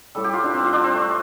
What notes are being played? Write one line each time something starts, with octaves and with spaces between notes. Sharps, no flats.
A2 G3 A4
G4
F4
D4
C4
F4
D4
C4
A3